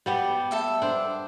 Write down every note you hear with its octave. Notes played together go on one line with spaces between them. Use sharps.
G3 B3 G4
A4 E5 G5
D4 C5